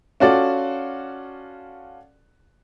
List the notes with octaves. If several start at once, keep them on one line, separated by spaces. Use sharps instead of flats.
C#4 F4 F#4 A4 D5